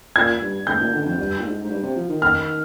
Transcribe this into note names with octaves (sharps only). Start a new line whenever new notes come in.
A#2 G#6
G2
G#2 G6
A#2
D3
F2
G2
A#2
G#2
G#2
G2
C3
F3
D#3
F6